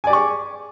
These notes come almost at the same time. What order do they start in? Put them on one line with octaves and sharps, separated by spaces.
G#5 D5 G4 C#6 G#4